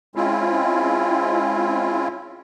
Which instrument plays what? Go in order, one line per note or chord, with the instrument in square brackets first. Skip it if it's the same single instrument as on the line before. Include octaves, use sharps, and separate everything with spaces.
[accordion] G#3 C4 C#4 E4 F4